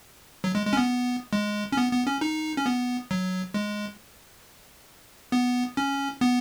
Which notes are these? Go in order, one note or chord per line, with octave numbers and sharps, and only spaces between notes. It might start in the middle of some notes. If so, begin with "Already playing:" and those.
F#3
G#3
G#3
C#4
B3
G#3
C#4
B3
B3
C#4
D#4
C#4
B3
F#3
G#3
B3
C#4
B3